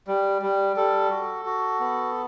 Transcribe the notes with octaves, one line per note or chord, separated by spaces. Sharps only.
G3
G3
G3 A4
F#4
F#4
B3